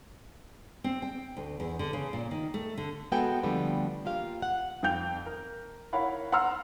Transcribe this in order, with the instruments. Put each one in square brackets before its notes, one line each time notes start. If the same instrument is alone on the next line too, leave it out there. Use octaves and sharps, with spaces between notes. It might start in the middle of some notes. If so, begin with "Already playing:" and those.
[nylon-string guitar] C4
G5
D2
E2
D3
C#3
A#2
D#3
A3
D3
G#3 B3 F#4 A4 G5 G#5
D3 F3 G3 A3 B3 C4
A#3 F4 G4 F5
F#5
[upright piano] F2 F5 G5 G6 F7
A#4
E4 A#4 C#5 F5 F#5 B5
F#5 A#5 C6 E6 F6